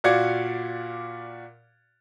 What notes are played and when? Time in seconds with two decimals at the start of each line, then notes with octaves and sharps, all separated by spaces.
0.04 A#2 F#4 D5 F5 G#6 C#7